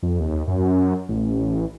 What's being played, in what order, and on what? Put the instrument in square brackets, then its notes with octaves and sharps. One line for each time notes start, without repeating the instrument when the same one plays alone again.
[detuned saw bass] F2
D#2
F#2
A1